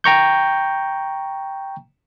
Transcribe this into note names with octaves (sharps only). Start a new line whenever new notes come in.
G5 A#5 C#6 G6